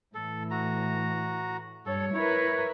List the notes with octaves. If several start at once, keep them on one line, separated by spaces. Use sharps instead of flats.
A2 E3 A4
F#4 A#5
G2 A4 C#5
E4 A#4 B4 C#5